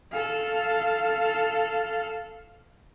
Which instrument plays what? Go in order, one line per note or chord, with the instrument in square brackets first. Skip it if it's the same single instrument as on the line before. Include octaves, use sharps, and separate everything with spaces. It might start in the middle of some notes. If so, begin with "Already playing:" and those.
[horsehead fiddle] A4 F5